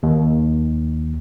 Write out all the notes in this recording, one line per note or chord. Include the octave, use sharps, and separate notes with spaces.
D#2